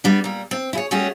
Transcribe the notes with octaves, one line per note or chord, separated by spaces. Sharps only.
G3 B3 D4
A#2 G3
C4
E4 G#4 C#5
G3 A3 C#4 F#4 G#4